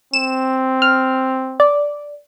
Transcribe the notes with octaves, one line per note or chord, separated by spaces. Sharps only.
C4 E7
F6
D5